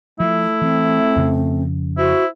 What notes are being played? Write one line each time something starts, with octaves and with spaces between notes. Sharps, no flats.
F3 A3 E4
E3 C4
F2 C#3 F3
E4 F#4 C5